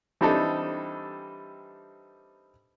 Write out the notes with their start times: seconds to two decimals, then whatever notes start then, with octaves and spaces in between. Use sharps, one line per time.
0.21 E3 G3 C4 D4 D#4 A4